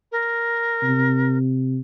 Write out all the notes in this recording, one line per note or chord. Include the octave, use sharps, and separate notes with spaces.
A#4
C3